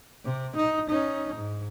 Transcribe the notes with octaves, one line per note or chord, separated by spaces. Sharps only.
C3
D#4
C#4 D#4
G#2